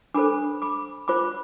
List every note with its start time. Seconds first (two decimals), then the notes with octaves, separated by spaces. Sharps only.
0.14 D4 A4 C5 B5 D6
0.62 B5 D6
1.08 F4 C5 B5 D6